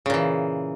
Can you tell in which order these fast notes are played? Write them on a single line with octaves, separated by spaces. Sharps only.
C#3 A#2 E3